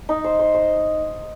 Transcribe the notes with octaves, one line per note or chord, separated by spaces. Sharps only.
D#4
C5
C5
C5